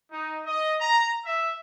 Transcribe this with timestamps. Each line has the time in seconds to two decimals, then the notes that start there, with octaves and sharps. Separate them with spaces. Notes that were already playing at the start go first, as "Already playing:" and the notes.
0.11 D#4
0.44 D#5
0.80 A#5
1.24 E5